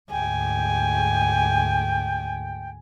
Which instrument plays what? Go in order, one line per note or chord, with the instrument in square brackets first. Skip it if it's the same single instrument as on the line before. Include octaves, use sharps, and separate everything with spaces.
[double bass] D2 G#2 [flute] G5 [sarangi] G#5